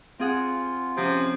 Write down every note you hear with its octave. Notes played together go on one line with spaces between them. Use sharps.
C4 F4 G#4 F#5
C3 F3 C#4